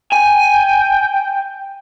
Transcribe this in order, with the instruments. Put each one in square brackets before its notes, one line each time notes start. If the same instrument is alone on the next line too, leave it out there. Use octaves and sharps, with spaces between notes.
[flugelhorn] G5 [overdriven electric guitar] G#5